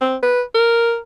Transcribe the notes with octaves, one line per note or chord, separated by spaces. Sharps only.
C4
B4
A#4